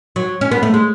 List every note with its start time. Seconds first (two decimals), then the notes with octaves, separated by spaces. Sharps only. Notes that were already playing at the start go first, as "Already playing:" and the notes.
0.16 F#3
0.41 C#4
0.51 B3
0.63 A3
0.74 G#3